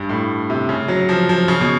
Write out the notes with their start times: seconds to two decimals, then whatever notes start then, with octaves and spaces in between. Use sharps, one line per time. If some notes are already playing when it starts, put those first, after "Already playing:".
Already playing: G2
0.09 A2
0.50 C3
0.69 C#3
0.88 F#3
1.09 F3
1.29 F3
1.48 C#3
1.60 B2